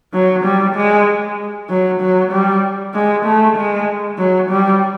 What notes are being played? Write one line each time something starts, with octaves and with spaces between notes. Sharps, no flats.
F#3
G3
G#3
F#3
F#3
G3
G#3
A3
G#3
F#3
G3